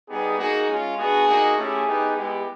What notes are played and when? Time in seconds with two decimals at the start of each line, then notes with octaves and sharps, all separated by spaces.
0.08 G3 B3 D#4 G4 G#4
0.38 A#3 D#4 F#4 G#4
0.67 G#3 C#4 F4
0.97 B3 D4 F#4 G#4
1.27 A#3 D#4 F#4
1.57 A3 C#4 E4 G4 G#4
1.87 B3 D#4 G4
2.16 G#3 B3 E4 G4